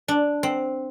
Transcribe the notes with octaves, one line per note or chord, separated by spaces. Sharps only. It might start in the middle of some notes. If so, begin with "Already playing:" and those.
D4
C4